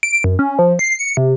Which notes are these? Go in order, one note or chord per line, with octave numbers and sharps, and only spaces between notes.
D7
F#2
C#4
F3
C7
C#7
C3